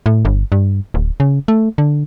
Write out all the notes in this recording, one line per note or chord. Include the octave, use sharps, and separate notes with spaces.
A2
G1
G2
D1
C#3
A3
D3